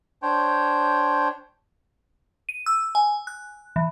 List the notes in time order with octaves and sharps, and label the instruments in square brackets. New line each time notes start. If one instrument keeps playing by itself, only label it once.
[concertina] D4 C5 C#5 G5
[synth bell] D#7
E6
G#5
F#6
E3